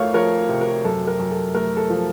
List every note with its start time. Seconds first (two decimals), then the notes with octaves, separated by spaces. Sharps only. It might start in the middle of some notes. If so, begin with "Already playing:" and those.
Already playing: F2 A3 A#4 C#5 F5
0.14 F3 A#4 C#5
0.49 C3
0.61 A#4
0.85 F#2 A4
1.07 A#4
1.19 F#2
1.31 A4
1.54 A3 A#4
1.77 A4
1.90 F3